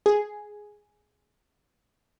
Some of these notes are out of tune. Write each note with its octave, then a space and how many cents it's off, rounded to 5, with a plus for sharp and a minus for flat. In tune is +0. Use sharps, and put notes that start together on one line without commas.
G#4 +0